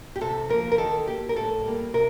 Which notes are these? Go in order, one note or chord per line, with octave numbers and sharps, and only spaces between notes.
G4
C3 A4
F3 A#3 A#4
A#4
D#3 A4
A#3 G4
A#4
A2 A4
G3 A#3
C3 A#4